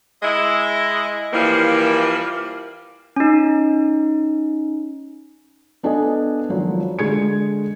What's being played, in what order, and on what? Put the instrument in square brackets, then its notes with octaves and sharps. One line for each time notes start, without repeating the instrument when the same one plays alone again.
[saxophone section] G#3 E4 D#5
E3 F3 G3 A#3
[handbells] C#4 D#4
[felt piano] B3 D4 A4 D#5 G#5
G#1 F3 F#3
D3 G#3 G#6 C#7